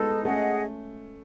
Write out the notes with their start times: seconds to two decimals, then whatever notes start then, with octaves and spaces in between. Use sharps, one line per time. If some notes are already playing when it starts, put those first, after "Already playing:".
Already playing: G#3 B3 D#4 A4
0.25 A3 C#4 G#4 D#5 F#5